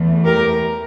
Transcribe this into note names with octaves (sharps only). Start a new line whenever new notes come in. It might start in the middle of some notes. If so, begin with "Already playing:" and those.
Already playing: E2 E3 A3
G4 A#4